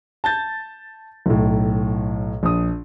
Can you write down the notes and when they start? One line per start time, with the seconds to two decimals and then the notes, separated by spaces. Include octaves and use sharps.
0.24 A5 G6 A6
1.26 B1 A2
2.43 A#1 D#6